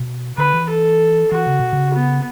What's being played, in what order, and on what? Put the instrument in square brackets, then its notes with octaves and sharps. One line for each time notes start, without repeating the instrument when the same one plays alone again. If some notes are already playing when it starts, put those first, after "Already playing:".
Already playing: [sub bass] B2
[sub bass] D3 [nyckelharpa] B4
[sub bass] E3
[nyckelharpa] A4
[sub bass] E3 [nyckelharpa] F#4
[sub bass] C#3
B2
C#3
[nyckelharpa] B3